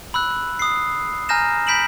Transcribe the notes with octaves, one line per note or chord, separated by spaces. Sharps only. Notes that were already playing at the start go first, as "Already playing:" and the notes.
B5 E6 F#6
D#6 C7
G#5 A#5 F6 G6 A#6 E7
B5 G6 B6 D7 E7 F#7